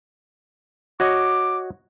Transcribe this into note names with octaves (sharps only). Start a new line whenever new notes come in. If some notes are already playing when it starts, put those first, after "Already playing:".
F#4 C#5 D#5 D6